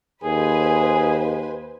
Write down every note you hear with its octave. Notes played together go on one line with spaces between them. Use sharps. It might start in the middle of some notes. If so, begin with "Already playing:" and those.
D#2 G#4 B4 C5 G#5